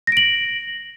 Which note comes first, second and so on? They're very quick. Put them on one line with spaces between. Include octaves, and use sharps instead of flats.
A#6 D7 F#7